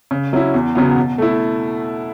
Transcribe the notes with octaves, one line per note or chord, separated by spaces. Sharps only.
C#3
F#3 C#4 E4
E2
C#3 F#3 B3
B2
A3 E4